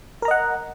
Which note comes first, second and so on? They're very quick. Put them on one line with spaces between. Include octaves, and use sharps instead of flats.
A#4 A#5 D#5 F#5